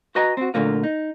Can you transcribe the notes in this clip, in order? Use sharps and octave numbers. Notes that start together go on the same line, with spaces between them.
F#4 B4 D#5 G#5 A#5
C4 F#4
A#2 D3 A3 A#3 F4
D#4